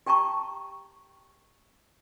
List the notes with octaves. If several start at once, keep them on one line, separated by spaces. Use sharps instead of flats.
G4 G5 A5 A#5 C#6